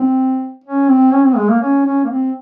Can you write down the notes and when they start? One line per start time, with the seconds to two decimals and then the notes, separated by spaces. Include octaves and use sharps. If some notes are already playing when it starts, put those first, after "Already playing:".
Already playing: C4
0.64 C#4
0.88 C4
1.12 C#4
1.24 C4
1.37 G#3
1.49 A#3
1.61 C#4
1.85 C#4
2.04 A#3
2.09 C4